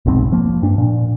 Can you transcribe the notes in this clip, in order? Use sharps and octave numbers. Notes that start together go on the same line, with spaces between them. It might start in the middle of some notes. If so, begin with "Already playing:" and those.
F1 B1 G#2 C4
F3 A#3
G2 D4
A#2